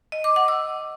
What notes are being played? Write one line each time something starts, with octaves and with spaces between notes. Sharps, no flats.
D#5
D6
F#5
E6